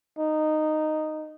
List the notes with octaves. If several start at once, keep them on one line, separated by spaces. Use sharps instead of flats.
D#4